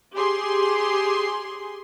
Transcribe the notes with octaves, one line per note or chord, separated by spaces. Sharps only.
G4 G#4 C6